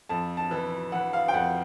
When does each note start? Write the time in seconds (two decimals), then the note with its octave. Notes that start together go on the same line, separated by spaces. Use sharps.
0.09 F2 A5
0.37 A5
0.51 E3
0.92 E3 F#5
1.13 F5
1.28 G5
1.34 F2 F#5